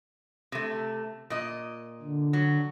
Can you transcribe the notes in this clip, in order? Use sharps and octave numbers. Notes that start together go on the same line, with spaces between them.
C3 A3
A#2 D#5
D3
F#3